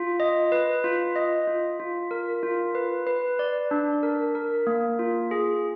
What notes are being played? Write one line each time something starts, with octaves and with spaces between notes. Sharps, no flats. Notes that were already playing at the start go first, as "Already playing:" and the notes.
Already playing: F4
D#5
B4
F4
D#5
F4
F4
A#4
F4
B4
B4
D5
D4
A#4
A#4
A#3
F4
G#4